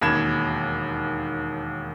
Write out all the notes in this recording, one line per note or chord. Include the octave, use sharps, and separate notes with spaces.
E1 D#2 A#3 B5 G#6 E7